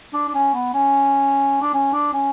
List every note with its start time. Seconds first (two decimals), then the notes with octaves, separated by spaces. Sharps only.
0.13 D4
0.28 D4
0.34 C#4
0.54 B3
0.74 C#4
1.62 D4
1.74 C#4
1.93 D4
2.13 C#4